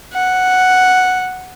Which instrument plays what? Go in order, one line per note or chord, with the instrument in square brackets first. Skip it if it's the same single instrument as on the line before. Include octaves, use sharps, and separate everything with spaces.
[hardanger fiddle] F#5